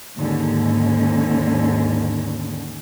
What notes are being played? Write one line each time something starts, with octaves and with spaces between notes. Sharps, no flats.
D#2 G#2 D3 C#4